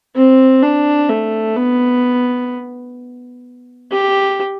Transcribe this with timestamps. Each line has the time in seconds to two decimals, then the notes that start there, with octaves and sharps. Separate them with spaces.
0.16 C4
0.62 D4
1.09 A3
1.56 B3
3.92 G4